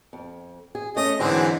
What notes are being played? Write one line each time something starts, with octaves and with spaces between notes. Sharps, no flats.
F2
G#4
A3 C#4 D#5
G#2 D3 E3 F#3 G#3 C4